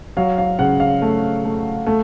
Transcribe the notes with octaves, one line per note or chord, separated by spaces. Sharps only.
F#3 F5
F5
C#3 F#5
F5
A3
A3
A3